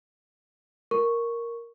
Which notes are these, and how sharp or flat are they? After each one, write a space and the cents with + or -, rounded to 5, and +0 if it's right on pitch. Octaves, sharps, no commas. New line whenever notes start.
A#4 +0 C#6 +0